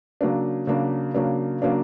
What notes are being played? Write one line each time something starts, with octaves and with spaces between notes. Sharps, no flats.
C#3 F#3 A#3 D4
C#3 F#3 A#3 D4
C#3 F#3 A#3 D4
C#3 F#3 A#3 D4